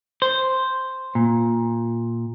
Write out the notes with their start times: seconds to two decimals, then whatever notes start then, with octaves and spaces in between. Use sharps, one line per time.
0.22 C5
1.15 A#2